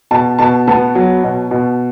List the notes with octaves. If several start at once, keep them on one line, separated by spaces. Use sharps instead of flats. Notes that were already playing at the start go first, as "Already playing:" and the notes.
B2 A5
B2 A5
B3 A5
F#3
B2
B2